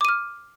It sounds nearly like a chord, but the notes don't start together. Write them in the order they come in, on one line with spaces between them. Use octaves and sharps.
D6 D#7 F6